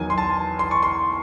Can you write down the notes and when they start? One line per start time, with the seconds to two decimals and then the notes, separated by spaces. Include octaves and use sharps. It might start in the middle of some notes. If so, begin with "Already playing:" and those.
Already playing: E2 D#3 F#3 G#5
0.10 C6
0.18 A5
0.59 C6
0.71 C#6
0.83 C6